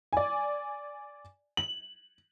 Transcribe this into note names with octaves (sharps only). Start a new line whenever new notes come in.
D5 G#5
F#7